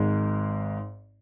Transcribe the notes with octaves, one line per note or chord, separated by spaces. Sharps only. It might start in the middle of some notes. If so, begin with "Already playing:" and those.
Already playing: G#1 G#2 G#3